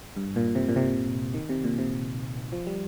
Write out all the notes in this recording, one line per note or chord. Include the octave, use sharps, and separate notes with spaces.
G2
A#2
C3
A#2
C3
D#3
C3
A#2
C3
F3
G3